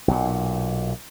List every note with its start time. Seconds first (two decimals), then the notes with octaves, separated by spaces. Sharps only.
0.08 B1 A#2